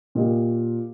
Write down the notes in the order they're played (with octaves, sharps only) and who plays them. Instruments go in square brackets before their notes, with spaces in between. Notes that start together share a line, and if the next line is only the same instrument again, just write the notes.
[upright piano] A#2 A#3 G4 D#5